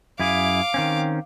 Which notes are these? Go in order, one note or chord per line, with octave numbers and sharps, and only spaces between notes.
F#2 E4 G#4 F5 D6
D#3 C4 C#4